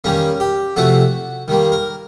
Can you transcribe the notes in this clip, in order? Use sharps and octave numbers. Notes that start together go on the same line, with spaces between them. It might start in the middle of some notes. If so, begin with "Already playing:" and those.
D#3 G3 A#3 C#4
G4
C3 F3 A3 F#4
D#3 G3 A#3
A#4